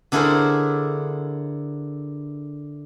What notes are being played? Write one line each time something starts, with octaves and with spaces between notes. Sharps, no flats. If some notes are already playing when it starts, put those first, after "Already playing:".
D3 D4 E4 G#4 A#4 C5